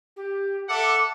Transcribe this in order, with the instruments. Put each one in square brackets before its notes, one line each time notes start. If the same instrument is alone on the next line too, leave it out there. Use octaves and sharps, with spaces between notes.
[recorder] G4
[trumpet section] A4 E5 F#5 [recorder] D6